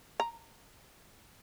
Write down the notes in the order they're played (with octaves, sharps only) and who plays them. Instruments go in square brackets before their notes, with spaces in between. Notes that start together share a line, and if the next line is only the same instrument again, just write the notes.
[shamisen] A#5